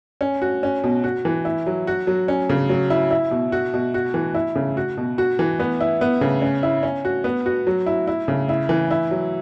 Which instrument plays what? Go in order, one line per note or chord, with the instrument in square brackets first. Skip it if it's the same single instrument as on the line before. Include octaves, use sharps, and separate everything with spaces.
[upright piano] C#4
F#4
C#4
B2
F#4
E3
E4
F#3
F#4
F#3
C#4
C#3
F#3
E4
E4
B2
F#4
B2
F#4
E3
E4
C#3
F#4
B2
F#4
E3
B3
E4
B3
C#3
C#4
E4
C#4
F#4
B3
F#4
F#3
E4
E4
C#3
E4
E3
E4
F#3